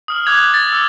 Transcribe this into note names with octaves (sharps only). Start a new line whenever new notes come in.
D#6 F6 F#7
D6 F#6 G#6 F7
A6
D6 E6